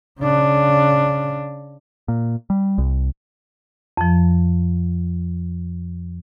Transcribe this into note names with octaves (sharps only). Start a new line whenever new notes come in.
C#3 D4
A#2
G3
C2
F2 F3